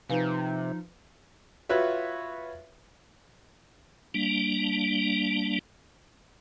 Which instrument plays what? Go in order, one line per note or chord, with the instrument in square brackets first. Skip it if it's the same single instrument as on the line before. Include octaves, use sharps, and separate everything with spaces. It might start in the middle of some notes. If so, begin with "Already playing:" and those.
[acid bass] C3 [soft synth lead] F3 [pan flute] D#4 [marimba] B4 F5 G#5
[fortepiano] F4 F#4 B4 C#5 E5
[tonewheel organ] G3 A#3 D4